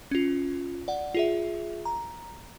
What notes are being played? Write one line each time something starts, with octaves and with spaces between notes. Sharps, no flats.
C#4 F4
D5 F#5
F4 G#4 E5
A#5